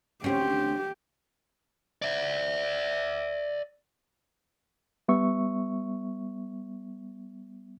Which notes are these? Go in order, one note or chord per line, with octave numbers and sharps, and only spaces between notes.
D2 C4 C#4 G4
D5 E5
G3 B3 E5 C#6